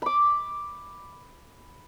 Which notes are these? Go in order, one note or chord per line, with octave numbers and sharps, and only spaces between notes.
B5 D6